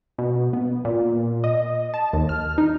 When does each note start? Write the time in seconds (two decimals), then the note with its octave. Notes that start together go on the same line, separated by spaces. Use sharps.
0.18 B2
0.53 B3
0.85 A#2
1.44 D#5
1.94 A5
2.13 D#2
2.29 F6
2.58 D#4